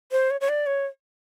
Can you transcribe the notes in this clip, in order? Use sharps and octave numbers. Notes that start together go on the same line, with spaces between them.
C5
C#5
C#5
D5
C#5